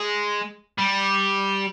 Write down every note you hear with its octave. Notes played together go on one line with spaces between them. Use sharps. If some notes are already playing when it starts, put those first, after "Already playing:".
Already playing: G#3
G3